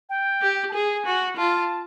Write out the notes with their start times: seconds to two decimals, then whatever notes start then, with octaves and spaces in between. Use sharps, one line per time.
0.09 G5
0.42 G4
0.69 A5
0.73 G#4 G#5
1.06 F#4
1.37 F4 A5